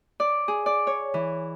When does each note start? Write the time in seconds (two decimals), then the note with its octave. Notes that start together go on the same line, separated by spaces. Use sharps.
0.20 D5
0.48 G#4
0.66 D5
0.87 C#5
1.14 E3